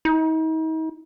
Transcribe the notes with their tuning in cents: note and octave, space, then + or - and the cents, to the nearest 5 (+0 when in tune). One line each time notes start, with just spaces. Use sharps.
D#4 +40